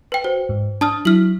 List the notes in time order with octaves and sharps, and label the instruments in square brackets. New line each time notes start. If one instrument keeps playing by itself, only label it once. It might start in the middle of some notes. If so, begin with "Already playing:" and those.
[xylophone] B4 G5
[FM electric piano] F#4 [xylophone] C5
[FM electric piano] G#2
[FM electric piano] D4 [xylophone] A5 D#6 F6
[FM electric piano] F#3 E4 [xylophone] F6 F#7